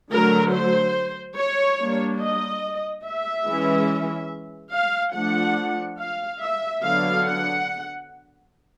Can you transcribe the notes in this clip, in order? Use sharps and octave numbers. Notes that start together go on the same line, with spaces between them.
D3 F#3 A3 A#4
C5
C#5
G3 A#3 D4
D#5
E5
E3 G#3 C#4
F5
F3 A3 D4 F#5
F5
E5
D3 F#3 B3 F5
F#5